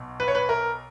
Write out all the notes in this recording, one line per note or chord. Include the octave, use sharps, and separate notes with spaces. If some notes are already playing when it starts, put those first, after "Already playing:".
Already playing: B1 B2
B4
C#5
B4
A#4